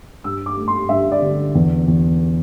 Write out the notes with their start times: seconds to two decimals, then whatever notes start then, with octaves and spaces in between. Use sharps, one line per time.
0.24 G2 E6
0.46 D6
0.57 A3
0.68 C6
0.89 G2 E5
1.12 D5
1.22 D3
1.55 E2
1.88 E2